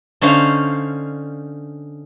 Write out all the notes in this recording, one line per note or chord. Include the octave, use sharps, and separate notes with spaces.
D3 C#4 D#4 C5 F5